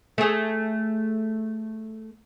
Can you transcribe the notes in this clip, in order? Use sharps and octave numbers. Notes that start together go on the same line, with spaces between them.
A3 G#4